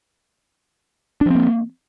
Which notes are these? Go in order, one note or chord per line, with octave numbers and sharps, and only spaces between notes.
F3 A#3 C4 D4